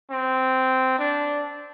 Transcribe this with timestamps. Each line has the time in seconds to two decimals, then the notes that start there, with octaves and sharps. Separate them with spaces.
0.10 C4
0.98 D4